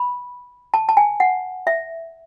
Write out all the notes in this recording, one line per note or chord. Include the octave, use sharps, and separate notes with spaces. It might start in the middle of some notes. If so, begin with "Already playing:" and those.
Already playing: B5
A5
A5
G#5
F#5
E5